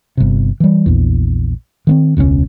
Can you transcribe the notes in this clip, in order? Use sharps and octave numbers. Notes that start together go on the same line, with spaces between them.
G1 C3
E3 G3
A#1 E2
D#3 B3 C4
E1 C#2 C#3 C#4